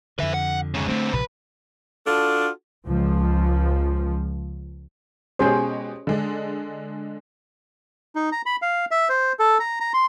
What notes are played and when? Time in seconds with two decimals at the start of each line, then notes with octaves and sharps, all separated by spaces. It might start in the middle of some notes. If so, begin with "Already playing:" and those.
0.19 F2 D3 B4 E5
0.34 F#5
0.74 G#2 C#3
0.88 D3 G#3 A3 C4
1.13 A#1 C3 F3 B4
2.06 D4 F4 F#4 A4
2.86 C#2 F3
5.39 B2 G#3 C#4 G4 G#4 C5
6.07 D3 G#3 D4
8.16 D#4
8.32 A#5
8.46 B5
8.62 F5
8.91 E5
9.09 C5
9.39 A4
9.60 A#5
9.80 A#5
9.94 C6